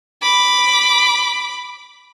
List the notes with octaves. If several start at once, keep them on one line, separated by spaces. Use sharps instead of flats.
B5 D6